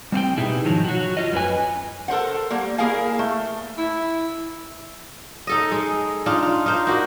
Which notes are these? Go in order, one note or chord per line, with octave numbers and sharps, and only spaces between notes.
G3 C4 F5 G5
B2 D#4 E4 G4 G#4
G#2 D#3 F3 F#3
F#3 F#4
F4 D#5
F#2 A3 C#4 B4 G#5
A4 A#4 C5 F#5
G3 A#3
A#3 E4 G#4 A#4 F5 G#5
A3
E4
D#4 A4 D#5
G#3
D4 D#4 F4
F4
D#4 F4 C5
A#3 F#4